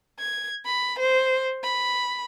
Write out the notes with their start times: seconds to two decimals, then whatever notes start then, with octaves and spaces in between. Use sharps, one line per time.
0.19 G#6
0.66 B5
0.99 C5
1.63 B5